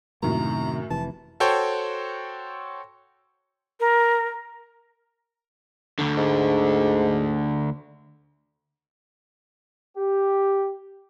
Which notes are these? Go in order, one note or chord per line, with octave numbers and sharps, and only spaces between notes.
F#2 A2 C3 D#3 A#3 A#5
F1 C3 E3 A5
F#4 A4 C5 C#5 G5 C6
A#4
D2 D3
G#2
G4